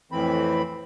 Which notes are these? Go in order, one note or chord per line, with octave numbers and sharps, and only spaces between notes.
F2 A2 E3 C4 B5